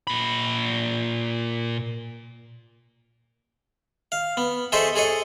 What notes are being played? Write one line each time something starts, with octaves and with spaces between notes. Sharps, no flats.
A#2 B5
F5
B3
G#4 A4 C5 C#5 D#5 E5
G#4 A4 C#5 D#5